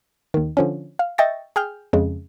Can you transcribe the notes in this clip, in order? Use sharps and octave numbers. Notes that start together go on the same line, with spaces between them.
D#2 D#3
D3 F3 C#4
F5
D#5 E5 G5 C#6 A6 A#6
G#4 G5 F6 G6
F2 C#3 G#3